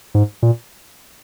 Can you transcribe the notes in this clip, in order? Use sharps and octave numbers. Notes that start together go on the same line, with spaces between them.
G#2
A#2